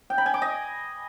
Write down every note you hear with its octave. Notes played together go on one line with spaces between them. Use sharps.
G5
B5
G#5
D6
D#5